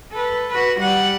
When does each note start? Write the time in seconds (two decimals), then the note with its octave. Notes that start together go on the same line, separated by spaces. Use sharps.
0.11 A4 B4
0.50 F#4 B4
0.80 G3 F#5